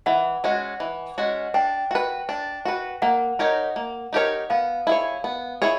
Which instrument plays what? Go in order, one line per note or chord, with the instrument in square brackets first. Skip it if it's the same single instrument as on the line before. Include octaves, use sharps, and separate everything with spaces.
[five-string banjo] E3 [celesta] F#5
[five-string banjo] G#3 C#4 F#4
E3
G#3 C#4 F#4
[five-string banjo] D4 [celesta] G5
[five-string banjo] F#4 B4
D4
F#4 B4
[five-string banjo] A#3 [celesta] F#5
[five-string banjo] D#4 G4 A#4 C#5
A#3
D#4 G4 A#4 C#5
[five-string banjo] B3 [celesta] F5
[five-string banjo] E4 G#4 C#5
B3
E4 G#4 C#5